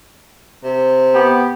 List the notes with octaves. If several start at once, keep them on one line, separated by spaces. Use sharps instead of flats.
C3
B3 G4